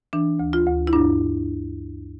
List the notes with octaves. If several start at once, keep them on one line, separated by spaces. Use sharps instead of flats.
E3 D4
D2
F4
D2
E4
G2 D4